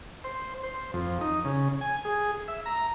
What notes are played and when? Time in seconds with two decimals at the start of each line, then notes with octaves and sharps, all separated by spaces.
0.24 C5
0.63 C5
0.94 F2
1.21 D#4
1.45 C#3
1.81 G#5
2.05 G#4
2.48 E5
2.66 A#5